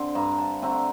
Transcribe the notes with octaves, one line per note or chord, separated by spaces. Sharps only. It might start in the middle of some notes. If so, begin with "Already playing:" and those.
Already playing: D3 C4 C6
G2 A#5
A5
D3 A3 C4 A#5